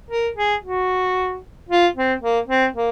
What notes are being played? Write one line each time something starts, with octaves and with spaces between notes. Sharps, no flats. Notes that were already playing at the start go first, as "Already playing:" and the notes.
A#4
G#4
F#4
F4
C4
A#3
C4
A#3